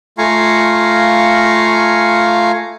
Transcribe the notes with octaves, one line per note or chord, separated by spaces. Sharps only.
A3 F4 F5 G#5 A#5 C#6